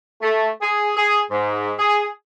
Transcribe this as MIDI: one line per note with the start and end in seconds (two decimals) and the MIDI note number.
0.22 0.48 57
0.61 0.91 68
0.96 1.21 68
1.31 1.73 44
1.79 2.07 68